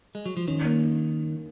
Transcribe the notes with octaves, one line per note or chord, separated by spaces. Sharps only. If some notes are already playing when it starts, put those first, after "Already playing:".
G#3
F#3
F3
D#3 C#4
A#3